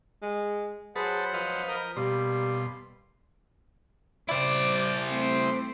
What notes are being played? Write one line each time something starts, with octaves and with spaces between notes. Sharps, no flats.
G#3
F#3 G#4 B4 C5 F#5 A5
F3 B4 D#5 F5
A#4 D#6 G6
B2 G3 A#3 C6
E4 C5 D5
A3 C4